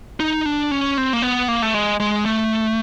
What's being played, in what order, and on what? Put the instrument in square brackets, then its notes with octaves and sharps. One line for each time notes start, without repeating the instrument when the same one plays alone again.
[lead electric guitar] D#4
D4
C#4
C4
A#3
B3
A#3
A3
G#3
G#3
A3